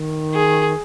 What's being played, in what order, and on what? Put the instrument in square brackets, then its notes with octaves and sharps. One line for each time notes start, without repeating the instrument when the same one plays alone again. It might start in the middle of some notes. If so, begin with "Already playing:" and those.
Already playing: [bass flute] D#3
[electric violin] G#4